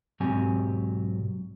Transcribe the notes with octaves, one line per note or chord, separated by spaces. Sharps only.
B1 G#2 F#3 C4 G4 G#5